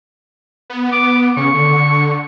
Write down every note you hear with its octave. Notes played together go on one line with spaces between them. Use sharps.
B3
B3 D6
C#3 C#6
D3